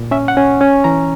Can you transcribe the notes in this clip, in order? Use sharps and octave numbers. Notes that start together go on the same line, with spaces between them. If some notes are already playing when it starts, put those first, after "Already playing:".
Already playing: A#2
C#4 E5
F#5
C#4
C#4
E3 A#5